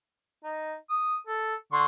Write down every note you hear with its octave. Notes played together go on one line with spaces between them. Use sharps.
D#4
D#6
A4
D3 C6 C#6